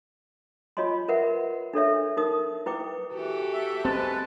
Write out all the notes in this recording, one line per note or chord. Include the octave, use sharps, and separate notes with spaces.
F4 C#5 D#5 G#5 C6
A#4 B4 E5 F#5
D4 A4 C#5 E5
D#4 A#4 D#6
E4 B4 G5 D6
E3 F#4 G4 A4
E5
G#3 C4 B4 A5